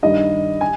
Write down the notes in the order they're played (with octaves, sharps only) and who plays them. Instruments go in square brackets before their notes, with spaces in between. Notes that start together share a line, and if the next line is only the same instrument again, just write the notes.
[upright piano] G2 D#3 G3 D#5
G#5